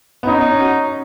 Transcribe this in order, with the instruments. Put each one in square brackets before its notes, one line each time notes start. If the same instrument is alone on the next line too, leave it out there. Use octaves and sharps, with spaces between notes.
[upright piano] B3
[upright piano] C#4 [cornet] D#4
[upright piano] C#4
F#4